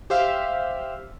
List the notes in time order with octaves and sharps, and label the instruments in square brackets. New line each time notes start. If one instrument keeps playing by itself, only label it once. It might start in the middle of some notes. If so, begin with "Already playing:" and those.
[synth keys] G4 C5 E5 F5